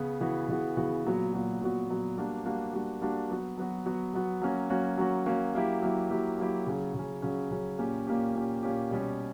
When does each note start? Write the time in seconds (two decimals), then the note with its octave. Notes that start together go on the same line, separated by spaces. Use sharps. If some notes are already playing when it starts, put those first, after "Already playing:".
Already playing: C#3 B3
0.20 C#3 E3 B3 F#4
0.49 C#3 E3 B3 F#4
0.77 C#3 E3 B3 F#4
1.05 A#2 F#3 B3 F#4
1.33 A#2 F#3 B3 F#4
1.61 A#2 F#3 B3 F#4
1.89 A#2 F#3 B3 F#4
2.17 G3 A#3 D4 F#4
2.45 G3 A#3 D4 F#4
2.73 G3 A#3 D4 F#4
3.01 G3 A#3 D4 F#4
3.29 F#3 B3 F#4
3.58 F#3 B3 F#4
3.86 F#3 B3 F#4
4.14 F#3 B3 F#4
4.42 F#3 A#3 C#4 F#4
4.70 F#3 A#3 C#4 F#4
4.98 F#3 A#3 C#4 F#4
5.26 F#3 A#3 C#4 F#4
5.55 F#3 A#3 E4 G4
5.82 F#3 A#3 E4 G4
6.10 F#3 A#3 E4 G4
6.39 F#3 A#3 E4 G4
6.67 C#3 F#3 C#4
6.95 C#3 F#3 C#4
7.22 C#3 F#3 C#4
7.51 C#3 F#3 C#4
7.78 A#2 A#3 C#4 G4
8.07 A#2 A#3 C#4 G4
8.35 A#2 A#3 C#4 G4
8.63 A#2 A#3 C#4 G4
8.91 B2 G3 C#4 G4